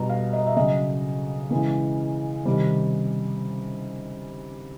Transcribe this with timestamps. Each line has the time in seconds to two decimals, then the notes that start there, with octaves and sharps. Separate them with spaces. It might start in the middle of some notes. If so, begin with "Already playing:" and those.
Already playing: B2 G3 A#5
0.10 F5
0.33 D#5
0.47 E5
0.56 C#3 F#3 D#5
1.51 C#3 E3 G#3
2.45 C3 D#3 G3